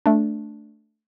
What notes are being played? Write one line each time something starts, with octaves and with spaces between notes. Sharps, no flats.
A3 D4